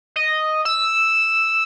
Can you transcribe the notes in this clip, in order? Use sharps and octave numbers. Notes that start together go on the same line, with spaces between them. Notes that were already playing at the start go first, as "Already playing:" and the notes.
D#5
E6